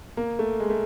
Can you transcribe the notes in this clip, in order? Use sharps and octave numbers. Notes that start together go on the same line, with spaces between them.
A#3
A3
G#3
A3